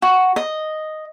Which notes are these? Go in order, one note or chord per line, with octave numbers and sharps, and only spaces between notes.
F#4
D#5